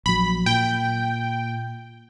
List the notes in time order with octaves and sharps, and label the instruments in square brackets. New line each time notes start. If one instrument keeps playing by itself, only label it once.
[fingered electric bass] A#1 F#3 [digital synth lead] B5
[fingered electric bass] A#2 [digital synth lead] G5